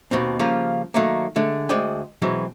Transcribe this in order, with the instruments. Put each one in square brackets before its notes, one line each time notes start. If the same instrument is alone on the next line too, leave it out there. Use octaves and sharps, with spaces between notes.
[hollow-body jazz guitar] D#2 B2 D#3 C4
C#3 F3 G3 A#3 F4
D#3 F#3 A3 A#3
D3 G#3 A3
D2 G#3 C5 D5 D#5 G5
B2 E3 F#3 G#3 C4